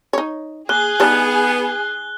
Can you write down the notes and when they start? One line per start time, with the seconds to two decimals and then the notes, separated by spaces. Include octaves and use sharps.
0.13 D#4 C#5
0.69 A#3 G#4 F#6 G7
1.00 G3 B3 D4 D#4